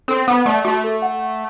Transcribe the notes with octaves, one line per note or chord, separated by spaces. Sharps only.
C4 A4
B3 F#5
A3 D5
A3 F#4
A4
F#5
F#5